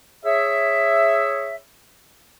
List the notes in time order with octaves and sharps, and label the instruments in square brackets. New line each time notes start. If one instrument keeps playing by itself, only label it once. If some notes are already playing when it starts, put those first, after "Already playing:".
[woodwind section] G#4 C#5 E5